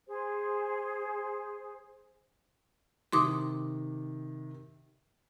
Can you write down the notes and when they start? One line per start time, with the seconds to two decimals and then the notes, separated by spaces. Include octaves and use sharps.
0.07 G#4 C5
3.13 C3 D#3 C6 D6 D#6